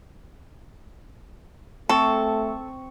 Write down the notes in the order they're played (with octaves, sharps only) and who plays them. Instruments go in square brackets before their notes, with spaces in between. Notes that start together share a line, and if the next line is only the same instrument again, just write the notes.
[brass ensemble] A3 [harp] C4 [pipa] A4 [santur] C#6